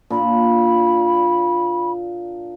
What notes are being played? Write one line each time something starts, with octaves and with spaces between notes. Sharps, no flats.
A#2 D4 B5